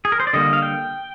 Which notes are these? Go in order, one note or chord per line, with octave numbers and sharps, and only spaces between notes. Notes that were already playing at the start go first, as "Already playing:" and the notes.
G#4
A#4
C5
D5
D3 G3 A#3 D#5
F5
G5